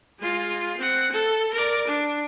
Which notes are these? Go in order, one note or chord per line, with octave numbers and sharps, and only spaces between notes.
G#3 F4
C4 F#5
A4
A#4 D5
D4